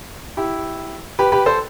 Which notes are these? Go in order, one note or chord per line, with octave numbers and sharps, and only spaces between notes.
E4 G4
G4 B4
G4 B4
A4 C5